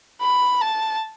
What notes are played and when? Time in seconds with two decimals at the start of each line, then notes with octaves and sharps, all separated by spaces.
0.21 B5
0.62 A5